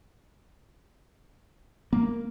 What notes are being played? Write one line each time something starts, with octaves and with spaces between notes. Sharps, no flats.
A#3